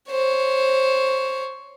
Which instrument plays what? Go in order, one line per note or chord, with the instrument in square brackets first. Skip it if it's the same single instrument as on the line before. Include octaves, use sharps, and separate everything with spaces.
[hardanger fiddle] C5 C#5